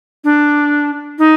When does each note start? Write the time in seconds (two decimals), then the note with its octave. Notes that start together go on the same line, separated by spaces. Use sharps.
0.24 D4
1.19 D#4